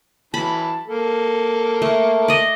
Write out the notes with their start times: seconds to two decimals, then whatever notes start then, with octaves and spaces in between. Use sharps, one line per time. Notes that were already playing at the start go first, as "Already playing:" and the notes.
0.34 E3 F#3 A5 B5
0.87 A#3 A4
1.82 A3
2.28 D5 D#5